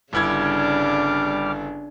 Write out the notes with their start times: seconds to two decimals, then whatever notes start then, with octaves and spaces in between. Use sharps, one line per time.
0.13 G1 C#3 G3 D4 E4 D6 F6 G#6